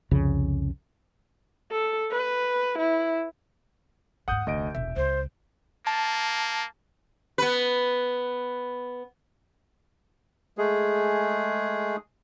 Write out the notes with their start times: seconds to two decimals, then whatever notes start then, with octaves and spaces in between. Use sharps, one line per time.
0.11 C2 F2 C#3
1.71 A4
2.11 B4
2.78 E4
4.28 D#2 G#2 F#5 D#6 G6
4.47 F1 D2 D#5 D7
4.75 E1 A#1 E5
4.96 C#2 C5
5.87 A#3 A5
7.38 B3 B4
10.58 G#3 A3 G#4